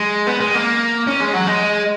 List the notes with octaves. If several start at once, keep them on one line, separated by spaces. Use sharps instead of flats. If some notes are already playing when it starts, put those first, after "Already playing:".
Already playing: G#3
B3
G#3
A#3
C#4
G#3
F#3
G#3